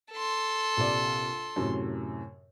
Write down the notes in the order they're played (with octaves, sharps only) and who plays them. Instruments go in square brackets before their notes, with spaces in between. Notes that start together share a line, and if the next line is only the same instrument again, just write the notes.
[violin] A4 C6
[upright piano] A#1 C3 D5
F#2 A2 C3